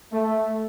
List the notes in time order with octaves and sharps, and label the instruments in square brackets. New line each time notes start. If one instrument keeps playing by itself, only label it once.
[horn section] A3